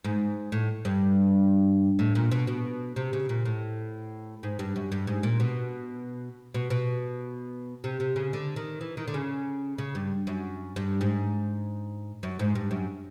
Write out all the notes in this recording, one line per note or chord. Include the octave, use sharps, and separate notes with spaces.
G#2
A2
G2
A2
A#2
B2
B2
C3
C#3
A#2
A2
G#2
G2
F#2
G2
G#2
A#2
B2
B2
B2
C3
C3
C#3
D3
D#3
E3
D#3
D3
C#3
C#3
G2
F#2
G2
G#2
F#2
G#2
G2
F#2